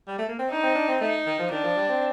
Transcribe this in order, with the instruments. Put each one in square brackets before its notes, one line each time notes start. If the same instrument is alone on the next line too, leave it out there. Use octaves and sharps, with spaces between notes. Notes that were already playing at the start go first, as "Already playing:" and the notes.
[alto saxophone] G3
A3
A#3
C4
[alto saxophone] D4 [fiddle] D#4
[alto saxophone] C4
D4
C4
[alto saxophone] A3 [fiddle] D#4
[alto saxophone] D#3
F3
[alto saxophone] D#3 [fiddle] D4
[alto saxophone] F3
G3
C4